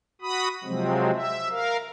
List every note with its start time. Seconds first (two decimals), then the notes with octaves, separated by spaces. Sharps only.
0.22 F#4 B5 D#6
0.64 C3 F3 F#3 G#3 C4
1.13 E5
1.50 A#4 F5